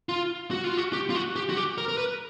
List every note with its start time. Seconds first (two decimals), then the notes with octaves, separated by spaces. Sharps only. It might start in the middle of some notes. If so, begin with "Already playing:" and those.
0.09 F4
0.51 F#4
0.64 F4
0.77 F#4
0.93 G4
1.10 F4
1.15 F#4
1.36 G4
1.49 F#4
1.56 G4
1.78 A#4
1.88 A#4
1.98 B4